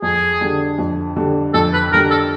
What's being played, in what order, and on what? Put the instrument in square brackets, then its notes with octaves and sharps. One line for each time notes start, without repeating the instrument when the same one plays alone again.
[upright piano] F2 [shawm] G#4
[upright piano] D3 G3
F2
D3 G3
[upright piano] F2 [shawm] A4
[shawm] B4
[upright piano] D3 G3 [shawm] A#4
[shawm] A4